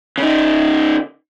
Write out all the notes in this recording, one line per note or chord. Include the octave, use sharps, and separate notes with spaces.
C#3 D#4